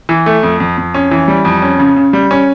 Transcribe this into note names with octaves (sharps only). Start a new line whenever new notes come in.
E3
A3
F2
F2
F2
C#4
E3
G3
F2
C#4
C#3
C#3
G3
C#4